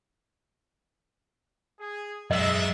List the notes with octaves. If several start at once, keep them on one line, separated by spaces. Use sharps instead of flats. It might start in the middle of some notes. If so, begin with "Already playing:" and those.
G#4
F#2 G#3 A4 D#5 E5